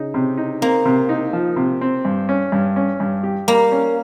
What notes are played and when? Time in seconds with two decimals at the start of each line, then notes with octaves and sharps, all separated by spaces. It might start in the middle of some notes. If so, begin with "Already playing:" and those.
Already playing: C#3 D#4
0.14 C3
0.37 D#4
0.62 A#3 C4
0.85 C3
1.09 D#4
1.33 F3
1.56 C3
1.81 C4
2.05 G2
2.29 C#4
2.52 G2
2.76 C#4
3.00 G2
3.23 G4
3.48 G3 A#3
3.72 C#4